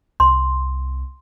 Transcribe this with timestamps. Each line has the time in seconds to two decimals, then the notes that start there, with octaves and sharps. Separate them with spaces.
0.20 C2 C6